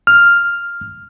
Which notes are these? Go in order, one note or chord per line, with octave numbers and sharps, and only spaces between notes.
F6